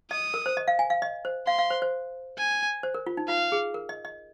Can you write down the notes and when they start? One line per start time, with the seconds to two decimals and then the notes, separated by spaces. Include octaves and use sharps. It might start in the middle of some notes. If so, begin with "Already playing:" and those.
0.11 D#5 D#6
0.34 A#4
0.46 C5
0.57 D#5
0.68 F5
0.79 G#5
0.90 F5
1.02 D#5
1.25 C5
1.47 F5 C6
1.59 F5
1.70 C5
1.82 C5
2.38 G#5
2.83 C5
2.95 A#4
3.07 F4
3.17 D#4
3.28 F4 F5
3.52 G#4
3.74 A#4
3.89 D#5
4.05 D#5